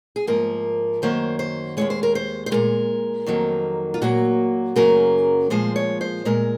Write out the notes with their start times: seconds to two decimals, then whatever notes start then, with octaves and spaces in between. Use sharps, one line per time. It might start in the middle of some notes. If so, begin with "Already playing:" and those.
0.16 G#4
0.27 G#2 F3 A#3 A#4
1.02 F#2 D#3 F#3 A#3 C5
1.39 C5
1.77 D#2 C#3 G#3 C#5
1.90 C5
2.03 A#4
2.15 C5
2.46 C5
2.51 A#2 G#3 A#4
3.26 F2 D#3 F#3 A#3
3.94 F4
4.01 A#2 F#3 A#3 F#4
4.76 F#2 C#3 F#3 A#3 A#4
5.50 A#2 F3 G#3 C5
5.76 C#5
6.01 C5
6.25 A#2 G#3 A#4